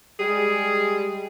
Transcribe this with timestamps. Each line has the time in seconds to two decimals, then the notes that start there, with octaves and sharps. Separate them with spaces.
0.20 G3 G#3 G#4